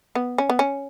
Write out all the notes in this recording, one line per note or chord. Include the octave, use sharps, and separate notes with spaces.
B3
C#4
B3
C#4